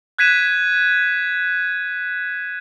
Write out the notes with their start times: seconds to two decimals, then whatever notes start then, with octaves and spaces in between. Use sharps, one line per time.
0.18 F#6 G#6 B6 D#7 E7